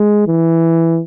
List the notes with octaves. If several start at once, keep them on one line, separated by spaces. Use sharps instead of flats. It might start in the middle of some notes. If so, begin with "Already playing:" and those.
Already playing: G#3
E3